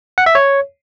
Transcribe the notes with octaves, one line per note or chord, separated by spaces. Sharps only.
F#5
E5
C#5